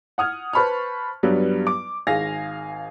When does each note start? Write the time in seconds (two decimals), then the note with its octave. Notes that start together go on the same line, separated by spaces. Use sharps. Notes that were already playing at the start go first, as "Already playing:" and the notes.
0.18 F#5 D#6 F6 G#6
0.53 B4 C5 A5 B5 C#6 F6
1.23 G2 F#3 G3 B3
1.67 D6
2.07 G#1 G#4 F5 G#5 A#6